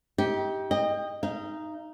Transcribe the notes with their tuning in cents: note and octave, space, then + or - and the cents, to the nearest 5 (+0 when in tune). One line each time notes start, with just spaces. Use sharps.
D#4 +35 G4 +0
D#5 -15 G5 +25
D#4 +0 F5 -45